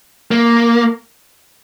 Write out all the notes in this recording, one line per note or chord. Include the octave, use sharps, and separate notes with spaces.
A#3